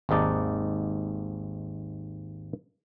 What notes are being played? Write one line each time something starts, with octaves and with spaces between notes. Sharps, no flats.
G#1 D#2 G#2 D#4 D5 A5